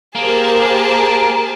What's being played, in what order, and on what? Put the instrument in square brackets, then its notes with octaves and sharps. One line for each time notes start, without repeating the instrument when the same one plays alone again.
[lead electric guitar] A#3 [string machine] G4 A#4 C5 [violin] G#4 A5